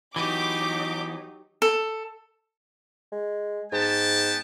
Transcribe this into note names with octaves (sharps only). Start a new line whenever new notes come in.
E3 F#3 B3 D#4 G4 D6
A4
G#3
G#2 B3 G5 A5